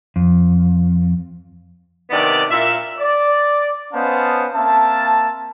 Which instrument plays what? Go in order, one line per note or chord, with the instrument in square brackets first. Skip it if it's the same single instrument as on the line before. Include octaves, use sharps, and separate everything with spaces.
[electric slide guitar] F2
[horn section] C3 D#3 B3 D4 D5
A#2 E5
[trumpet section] D5
B3 C#4 C5 D#5 F5 A5
A#3 C4 E5 A5